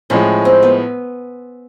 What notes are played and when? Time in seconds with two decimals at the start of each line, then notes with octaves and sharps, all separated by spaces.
0.10 A2 F3 G#3 C#4
0.45 C4
0.63 B3